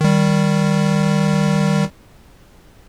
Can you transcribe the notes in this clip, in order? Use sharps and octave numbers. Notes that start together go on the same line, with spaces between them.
D#3 G3